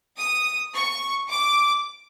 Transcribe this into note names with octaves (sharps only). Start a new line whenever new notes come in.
D#6
C#6
D6